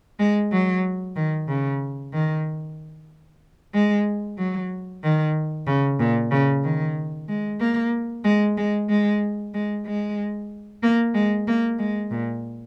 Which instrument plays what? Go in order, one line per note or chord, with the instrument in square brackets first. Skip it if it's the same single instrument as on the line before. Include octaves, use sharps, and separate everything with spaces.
[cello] G#3
F#3
D#3
C#3
D#3
G#3
F#3
D#3
C#3
A#2
C#3
D#3
G#3
A#3
G#3
G#3
G#3
G#3
G#3
A#3
G#3
A#3
G#3
A#2